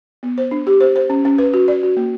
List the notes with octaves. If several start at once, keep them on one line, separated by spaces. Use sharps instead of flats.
B3
C5
D4
G4
C5
C5
C#4
C#4
B4
F#4
D5
F#4
A#3